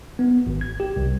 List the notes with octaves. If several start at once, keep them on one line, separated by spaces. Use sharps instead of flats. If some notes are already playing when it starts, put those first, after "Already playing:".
B3
G#1
G#6
G4
C2